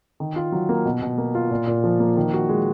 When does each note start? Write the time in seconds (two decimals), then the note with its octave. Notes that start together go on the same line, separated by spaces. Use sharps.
0.20 D#3
0.36 F4
0.52 F#3
0.69 A#3
0.85 B2
1.02 B2
1.18 A#3
1.35 F4
1.51 A#2
1.67 A#2
1.84 F3
2.00 A#3
2.17 D#3
2.34 F#4
2.49 G#3